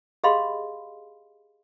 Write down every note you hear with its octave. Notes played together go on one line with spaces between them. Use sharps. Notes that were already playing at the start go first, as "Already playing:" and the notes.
G4 G#4 D#5 F5 B5 C6